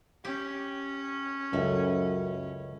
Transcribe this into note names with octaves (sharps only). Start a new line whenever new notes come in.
C#4 G4
C#2 F#2 A3 E4